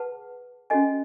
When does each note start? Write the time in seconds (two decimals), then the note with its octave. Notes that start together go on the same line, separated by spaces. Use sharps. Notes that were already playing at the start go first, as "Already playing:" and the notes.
Already playing: G#4 B4 F#5 A5
0.70 C#4 F#4 A4 D#5 G#5